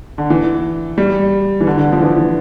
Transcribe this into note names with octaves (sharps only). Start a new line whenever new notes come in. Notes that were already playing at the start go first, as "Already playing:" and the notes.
D3
E3
G3
E3
D3
D3
F3
E3
E3